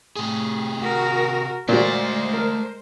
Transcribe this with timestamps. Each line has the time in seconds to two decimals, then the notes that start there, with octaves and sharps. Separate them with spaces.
0.16 A2 C3 G#4
0.79 F#4 A#4
1.69 A#2 G#3 A3 F#4 C5 D5
2.33 A#4